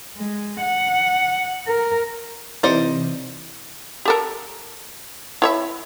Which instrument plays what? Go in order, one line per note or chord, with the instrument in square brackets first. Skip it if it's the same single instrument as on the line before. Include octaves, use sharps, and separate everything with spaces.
[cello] G#3
F#5
A#4
[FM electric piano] C3 E3 [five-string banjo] D#4 C5 D5
[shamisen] G4 A4 A#4
E4 C#5 E5